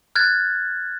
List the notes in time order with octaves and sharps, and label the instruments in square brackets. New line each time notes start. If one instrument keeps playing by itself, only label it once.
[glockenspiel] F6 F#6 G#6 A6